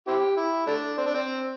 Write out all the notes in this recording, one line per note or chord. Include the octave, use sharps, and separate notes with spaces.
C4 E4 G4
E4
A3 D4
C4
D4
C4